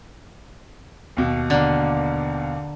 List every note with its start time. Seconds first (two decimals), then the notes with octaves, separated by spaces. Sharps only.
1.17 D#2 B2
1.50 D3 A#3